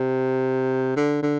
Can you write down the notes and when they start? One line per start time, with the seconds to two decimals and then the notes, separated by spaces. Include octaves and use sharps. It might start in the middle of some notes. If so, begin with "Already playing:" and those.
Already playing: C3
0.96 D3
1.22 D3